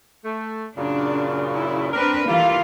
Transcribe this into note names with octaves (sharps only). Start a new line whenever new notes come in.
A3
F#2 A#2 C#3 D4
E4
C4 D4 A#4 B4
E3 G3 A3 A#3 F4